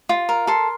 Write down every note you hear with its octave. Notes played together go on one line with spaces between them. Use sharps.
F4
A#4
A4 C6